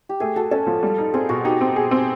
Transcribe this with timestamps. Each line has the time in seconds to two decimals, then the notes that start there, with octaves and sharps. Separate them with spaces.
0.09 G4
0.20 A3 G#4
0.36 F#4 A4
0.51 C#4 A4
0.67 F3
0.83 G3
0.98 D#4
1.14 C4 G#4
1.29 B2 F#4
1.45 D#4 G4
1.61 C4
1.76 G#4
1.91 C4